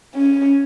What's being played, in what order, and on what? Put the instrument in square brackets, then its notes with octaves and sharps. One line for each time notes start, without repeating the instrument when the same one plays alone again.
[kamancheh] C#4